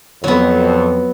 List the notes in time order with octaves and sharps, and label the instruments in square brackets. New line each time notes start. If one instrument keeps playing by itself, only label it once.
[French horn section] F2 [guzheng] F#3 B3